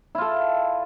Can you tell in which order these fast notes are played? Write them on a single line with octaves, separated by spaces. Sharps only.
E4 F4 A4